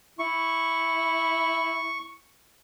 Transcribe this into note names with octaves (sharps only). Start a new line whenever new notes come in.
E4 C#6